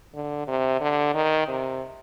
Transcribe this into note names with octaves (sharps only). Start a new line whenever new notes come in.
D3
C3
D3
D#3
C3